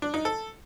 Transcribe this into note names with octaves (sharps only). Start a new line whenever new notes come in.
D4
D#4
A4